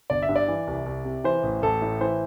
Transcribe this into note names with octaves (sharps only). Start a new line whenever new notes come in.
G1 D5
E5
G2
D5
E3
C2
C2
C3
E3 C5
A1
A1 A4
A2
E3 C5